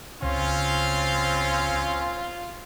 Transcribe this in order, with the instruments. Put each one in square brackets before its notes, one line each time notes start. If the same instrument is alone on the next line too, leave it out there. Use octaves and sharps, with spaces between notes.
[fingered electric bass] C#2 C#3 [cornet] C4 [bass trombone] C#4 [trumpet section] F4